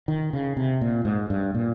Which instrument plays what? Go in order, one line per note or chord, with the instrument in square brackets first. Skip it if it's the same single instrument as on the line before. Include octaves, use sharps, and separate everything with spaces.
[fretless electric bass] D#3
C#3
C3
A#2
G#2
G2
A#2